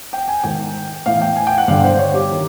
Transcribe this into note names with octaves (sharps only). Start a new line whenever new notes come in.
G5
G#5
G#2 D#3 G5
A2 E3 F5
G5
G#5
G5
F#5
G2 D3 F5
C5
C#5
G4
D#3